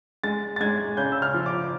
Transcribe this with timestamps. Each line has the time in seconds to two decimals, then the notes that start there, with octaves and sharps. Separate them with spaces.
0.24 G#3 A6
0.56 A6
0.60 G#3 G#6
0.97 C#3 G6
1.12 E6
1.22 F6
1.34 F3
1.46 D6